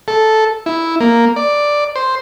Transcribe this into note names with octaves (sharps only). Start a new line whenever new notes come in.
A4
E4
A#3
D5
C5